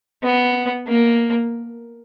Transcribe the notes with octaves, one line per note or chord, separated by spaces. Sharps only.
B3
A#3